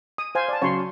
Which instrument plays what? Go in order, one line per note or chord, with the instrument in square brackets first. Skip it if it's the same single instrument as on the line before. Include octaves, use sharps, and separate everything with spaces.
[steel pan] D#6
C5 F5 G#5
D5 A5
[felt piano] C#3 F#3 [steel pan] C#5 C6